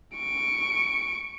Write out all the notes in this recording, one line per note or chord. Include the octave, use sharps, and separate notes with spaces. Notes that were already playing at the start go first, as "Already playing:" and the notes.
C#6 D7